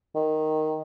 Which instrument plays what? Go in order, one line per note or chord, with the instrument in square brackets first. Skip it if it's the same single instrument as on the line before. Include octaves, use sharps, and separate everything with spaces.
[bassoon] D#3